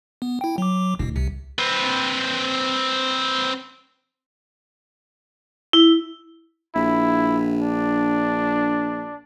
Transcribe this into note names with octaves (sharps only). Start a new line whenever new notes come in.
B3
E4 G5
F#3 D6
D2 B2 E4
C2 C3
C4 B4
E4
A#1 E4
D4